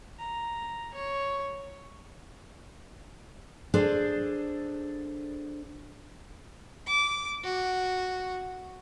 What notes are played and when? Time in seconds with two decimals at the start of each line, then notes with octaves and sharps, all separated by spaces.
0.19 A#5
0.95 C#5
3.74 D4 G#4 A4 C5
6.87 D6
7.43 F#4